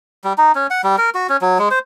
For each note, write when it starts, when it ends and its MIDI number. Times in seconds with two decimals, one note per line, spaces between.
0.24 0.33 55
0.38 0.52 63
0.55 0.67 61
0.70 0.81 78
0.84 0.96 55
0.98 1.10 70
1.15 1.27 66
1.29 1.37 61
1.42 1.58 54
1.59 1.68 56
1.71 1.79 72